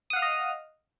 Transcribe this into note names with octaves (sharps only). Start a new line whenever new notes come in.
D#5 F5 F#5 D#6 F6